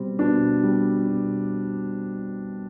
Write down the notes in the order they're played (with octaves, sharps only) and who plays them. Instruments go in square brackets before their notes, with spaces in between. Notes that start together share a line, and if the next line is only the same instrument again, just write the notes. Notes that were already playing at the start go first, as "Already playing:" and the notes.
Already playing: [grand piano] B2 G3 C4
B2 D4
G3
B2